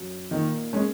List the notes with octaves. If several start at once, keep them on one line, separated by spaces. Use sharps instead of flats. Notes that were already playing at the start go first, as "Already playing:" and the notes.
Already playing: F#2 F#3 C#4
A#2 D#3 A#3 D#4
G#3 C#4